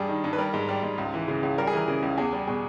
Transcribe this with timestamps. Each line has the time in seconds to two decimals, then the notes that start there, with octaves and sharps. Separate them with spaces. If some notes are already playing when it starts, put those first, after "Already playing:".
Already playing: G2 G3 G#4
0.09 D#3
0.24 G2
0.33 B4
0.38 G3 A#4
0.54 G#2
0.69 G3
0.83 G#2
0.98 C#2
1.14 E3
1.28 C#3
1.43 C#2
1.58 G3 A#4
1.67 G#4
1.73 E3 A#4
1.88 C#3
2.02 C#2
2.18 E2 G#4
2.33 G3
2.47 B2 G#4